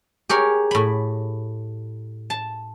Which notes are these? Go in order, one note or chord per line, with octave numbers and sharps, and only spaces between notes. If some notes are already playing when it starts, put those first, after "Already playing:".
G4 G#4 A#4 C#5
A2 B5
A5